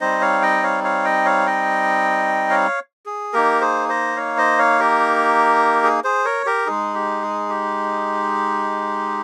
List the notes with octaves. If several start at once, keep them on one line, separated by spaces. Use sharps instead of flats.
G3 C4 D#4 C5 D#5
C#5 F5
D#5 G5
C#5 F5
C#5 F5
D#5 G5
C#5 F5
D#5 G5
C#5 F5
G#4
A#3 D#4 G4 A#4
G#4 C5
C5 D#5
C#5 F5
C5 D#5
C#5 F5
G4 A#4
G#4
G#4 C5
A#4 C#5
G4 A#4
G#3 D#4 G#4
G4
G#4
G4